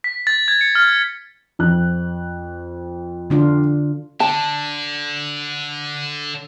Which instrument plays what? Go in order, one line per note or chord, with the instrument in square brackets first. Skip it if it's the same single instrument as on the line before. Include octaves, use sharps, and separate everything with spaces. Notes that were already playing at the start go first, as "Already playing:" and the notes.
[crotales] B6
A6
G#6
C#7
F6
[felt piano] F2 F3 F#6
[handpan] D3 D4 F4
[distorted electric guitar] D3 [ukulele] A5